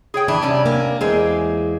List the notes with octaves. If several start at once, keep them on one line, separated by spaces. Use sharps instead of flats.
G#4 C#5 G5
E3 D4
C3 G3 C#4
A#3
E2 G#3 A#3 C4 G#4